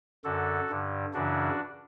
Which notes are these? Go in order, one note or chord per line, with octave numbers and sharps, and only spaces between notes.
F#2 D3 F#4 A4
G2 D3
F#2 C#3 E3 D4 F#4